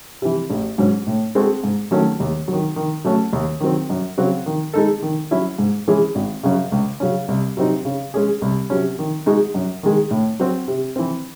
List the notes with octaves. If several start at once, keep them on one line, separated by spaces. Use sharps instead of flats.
C3 E3
A1
G#2 F#3 C#4
A2
G#3 C4 F#4 A4
G#2
D#3 F#3 A3 C#4
D#2
D#3 F#3
D#3
F#3 A3 C#4 F#4
D#2
D#3 F#3 C4
F#2
C#3 F#3 C4 F#4
D#3
G#3 D#4 A4
D#3
F#3 C#4 E4
G#2
E3 G#3 C#4 G#4
G#1
F#2 C#3
C#2
C#3 F#3 C#4
C2
C3 F#3 C4 D#4
C#3
G#3 C#4 G#4
C2
C3 F#3 C#4
D#3
G#3 D#4 F#4
F#2
D#3 G#3
A2
F#3 C4 F#4
C3
E3 C4